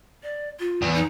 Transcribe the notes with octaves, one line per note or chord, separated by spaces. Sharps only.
D5
F4
E2
D#4